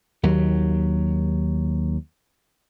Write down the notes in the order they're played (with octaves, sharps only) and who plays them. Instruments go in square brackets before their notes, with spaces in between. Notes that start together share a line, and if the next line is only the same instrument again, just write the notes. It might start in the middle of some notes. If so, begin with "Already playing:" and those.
[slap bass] D#2 F#3